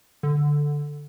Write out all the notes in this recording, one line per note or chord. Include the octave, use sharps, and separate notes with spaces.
D3